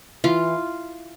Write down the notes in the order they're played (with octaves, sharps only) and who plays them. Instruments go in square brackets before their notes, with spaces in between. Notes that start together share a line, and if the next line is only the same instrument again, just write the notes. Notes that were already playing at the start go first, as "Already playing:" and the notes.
[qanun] E3 F4